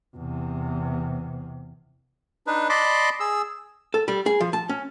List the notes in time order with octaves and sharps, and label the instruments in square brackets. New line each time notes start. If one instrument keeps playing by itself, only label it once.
[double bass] E2 C3
[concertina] D4 D#4 B4
D5 D#5 A5 B5 C6 D6
G#4 E6
[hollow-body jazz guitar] A4
G3
G#4
F3
A5
C#4